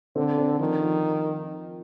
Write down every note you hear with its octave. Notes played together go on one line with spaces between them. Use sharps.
D3 C4
C4
D#3 F3
F3